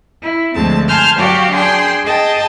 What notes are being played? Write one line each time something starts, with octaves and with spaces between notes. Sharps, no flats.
E4
D2 F3 G#3 C4 A5
G#5 A5 C6 F6 G6
F#3 F#4 G4 D5 F5
D4 G#4 G5 C6
G#4 D#5 G5 A5